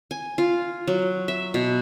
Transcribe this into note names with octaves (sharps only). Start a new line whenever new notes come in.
G#5
F4
F#3
E5
B2